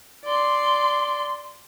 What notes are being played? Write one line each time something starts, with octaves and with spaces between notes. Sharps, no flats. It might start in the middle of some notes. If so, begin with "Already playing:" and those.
D5 C6